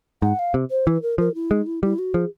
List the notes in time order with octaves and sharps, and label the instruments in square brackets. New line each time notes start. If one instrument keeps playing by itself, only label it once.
[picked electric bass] G#2 [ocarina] F#5
[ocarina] F5
[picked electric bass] C3
[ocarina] C5
[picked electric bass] E3 [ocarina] B4
[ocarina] A#4
[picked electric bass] F3 [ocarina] A#4
[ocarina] E4
[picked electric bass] G#3 [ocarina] D#4
[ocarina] E4
[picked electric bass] G3 [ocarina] E4
[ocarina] F#4
[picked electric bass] F3 [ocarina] G#4